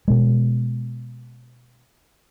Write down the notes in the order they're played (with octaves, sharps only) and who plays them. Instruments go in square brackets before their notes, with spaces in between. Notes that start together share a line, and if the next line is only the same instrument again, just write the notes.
[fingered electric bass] B2 G#3